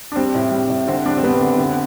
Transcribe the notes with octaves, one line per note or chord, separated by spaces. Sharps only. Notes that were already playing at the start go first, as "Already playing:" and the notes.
D4
G3 C4
A2
G3
A2
D3 C4
G3 D4
C4
G3 B3
D3
D3